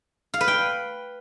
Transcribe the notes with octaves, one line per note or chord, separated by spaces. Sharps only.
F5
B4
G5